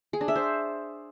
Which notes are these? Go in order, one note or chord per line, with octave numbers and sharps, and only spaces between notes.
G#4
D4
E5
C5